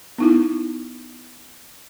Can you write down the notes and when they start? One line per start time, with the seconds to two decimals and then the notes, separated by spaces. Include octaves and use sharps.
0.18 B3 D#4 E4